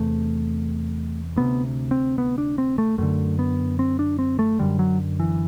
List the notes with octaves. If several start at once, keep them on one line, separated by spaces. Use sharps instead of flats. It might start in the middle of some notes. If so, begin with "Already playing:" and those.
Already playing: E2 C3 A3
D2 C3 B3
C4
B3
D4
C4
A3
F#2 D3 A3
B3
C4
D4
C4
A3
F#2 D3 G3
F#3
E3